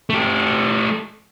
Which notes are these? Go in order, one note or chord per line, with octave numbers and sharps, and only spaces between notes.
A3 G4